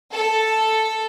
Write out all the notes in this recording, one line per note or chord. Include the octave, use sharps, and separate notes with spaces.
A4